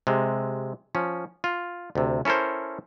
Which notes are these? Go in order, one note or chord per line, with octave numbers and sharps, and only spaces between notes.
C3 G#3
F3 C#4
F4
D2 C3
C#4 E4 A4 A#4 C5